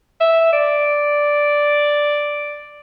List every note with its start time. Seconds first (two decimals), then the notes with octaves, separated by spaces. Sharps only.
0.20 E5
0.53 D5